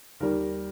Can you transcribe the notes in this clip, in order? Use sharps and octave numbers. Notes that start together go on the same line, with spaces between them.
D#2 D#3 G3 A#4